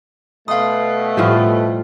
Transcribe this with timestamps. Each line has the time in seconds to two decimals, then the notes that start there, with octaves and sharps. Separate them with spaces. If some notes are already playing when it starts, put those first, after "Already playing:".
0.48 B2 A3 F5 C6 D#6
1.17 A2 F3 G3 F4 G4